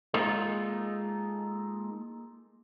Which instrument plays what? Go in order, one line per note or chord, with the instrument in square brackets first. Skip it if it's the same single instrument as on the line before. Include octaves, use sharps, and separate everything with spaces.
[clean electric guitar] G#3 A#3 D#4 F4 G#4 A4